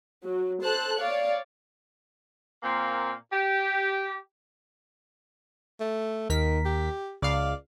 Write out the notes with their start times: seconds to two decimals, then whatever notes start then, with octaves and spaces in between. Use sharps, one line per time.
0.22 F#3
0.62 A4 C5 A5 F#6
1.00 C#5 D5 F5
2.62 A#2 A#3 C4
3.32 G4
5.80 A3
6.29 D#2 D#3 A#4 B6
6.65 G4
7.22 C#2 D5 F5